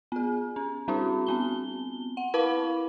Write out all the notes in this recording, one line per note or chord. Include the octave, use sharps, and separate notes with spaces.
B3 G#4
C#4
G3 C4 D4 E4 F#4
B3 C4 G7
F#5
E4 B4 F5 A5 B5 D6